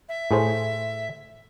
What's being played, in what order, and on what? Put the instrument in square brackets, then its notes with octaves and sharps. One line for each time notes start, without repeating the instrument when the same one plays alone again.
[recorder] E5
[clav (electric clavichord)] A2 G#4 C5